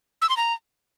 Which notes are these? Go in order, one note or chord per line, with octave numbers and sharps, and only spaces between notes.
E6
C6
A#5